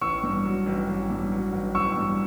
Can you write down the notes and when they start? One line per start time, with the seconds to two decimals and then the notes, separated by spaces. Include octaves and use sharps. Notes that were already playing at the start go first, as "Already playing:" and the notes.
0.01 A1 C#6 E6
0.23 G2
0.45 F#3
0.66 A1
0.88 A1
1.10 G2
1.32 F#3
1.52 A1
1.75 A1 C#6 E6
1.97 G2